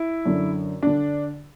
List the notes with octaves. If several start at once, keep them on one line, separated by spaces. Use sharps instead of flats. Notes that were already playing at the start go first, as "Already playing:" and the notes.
Already playing: E4
F#2 D3
D3 D4